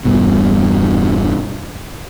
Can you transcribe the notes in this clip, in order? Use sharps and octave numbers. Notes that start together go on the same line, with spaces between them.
E1 G2 B2